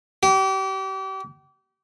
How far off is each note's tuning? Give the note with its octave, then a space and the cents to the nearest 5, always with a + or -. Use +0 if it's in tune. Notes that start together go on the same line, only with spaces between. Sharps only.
G4 -35